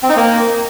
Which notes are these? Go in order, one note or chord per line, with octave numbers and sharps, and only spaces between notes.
C4
D#4
A#3